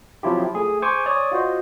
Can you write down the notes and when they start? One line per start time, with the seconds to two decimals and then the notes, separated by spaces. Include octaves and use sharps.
0.23 C3 F3 F#3 E4 F4 G4
0.55 A3 G#4
0.82 C5 G#5 C#6 D6
1.06 C#5 D5 D#6
1.31 F4 F#4 C5 D#5